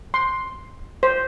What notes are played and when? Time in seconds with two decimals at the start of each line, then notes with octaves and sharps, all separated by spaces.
0.14 C6
1.03 C5